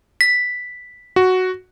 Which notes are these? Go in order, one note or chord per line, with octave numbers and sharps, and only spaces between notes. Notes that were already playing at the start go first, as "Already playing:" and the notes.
B6
F#4